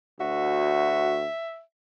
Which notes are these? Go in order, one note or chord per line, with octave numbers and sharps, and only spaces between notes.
D2 F#4 E5